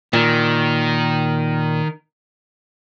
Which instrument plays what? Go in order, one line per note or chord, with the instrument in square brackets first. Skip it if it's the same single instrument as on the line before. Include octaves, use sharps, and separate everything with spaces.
[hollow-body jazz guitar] A#2 [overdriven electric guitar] D#3